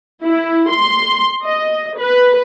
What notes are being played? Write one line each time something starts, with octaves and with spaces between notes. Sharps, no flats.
E4
C6
D#5
B4